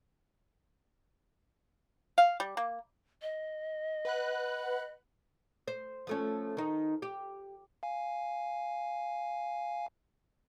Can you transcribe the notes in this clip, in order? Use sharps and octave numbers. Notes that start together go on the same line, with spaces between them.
F5
G3
A#3
D#5
B4 F#5 F#6
C5
F3 A3 C#4
D#3 D#4
G4
F5 G#5